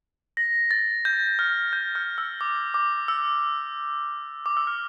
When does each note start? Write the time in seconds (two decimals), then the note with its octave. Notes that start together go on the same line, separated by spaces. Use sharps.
0.37 A#6
0.71 A6
1.05 G6
1.39 F6
1.73 G6
1.95 F6
2.18 E6
2.41 D6
2.74 D6
3.08 E6
4.46 D6
4.57 E6
4.67 F6